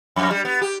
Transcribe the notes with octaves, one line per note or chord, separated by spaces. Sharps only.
F2
G3
B3
G4